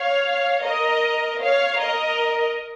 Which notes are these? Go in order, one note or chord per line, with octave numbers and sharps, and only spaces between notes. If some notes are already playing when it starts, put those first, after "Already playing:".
Already playing: C#5 F5
A#4 D#5
C#5 F5
A#4 D#5